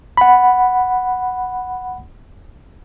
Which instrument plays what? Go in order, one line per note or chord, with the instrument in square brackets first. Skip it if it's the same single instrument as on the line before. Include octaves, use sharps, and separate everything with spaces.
[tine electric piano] F#5 B5